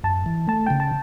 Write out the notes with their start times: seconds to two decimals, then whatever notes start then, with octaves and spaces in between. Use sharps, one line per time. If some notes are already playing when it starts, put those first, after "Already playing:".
0.04 F#2 A5
0.26 E3
0.47 A3 A5
0.66 C#3 G5
0.80 A5